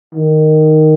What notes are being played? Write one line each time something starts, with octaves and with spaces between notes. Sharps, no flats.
D#3